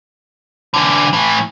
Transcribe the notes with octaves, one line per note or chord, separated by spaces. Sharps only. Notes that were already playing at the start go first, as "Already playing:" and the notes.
D3 E3
A2 E3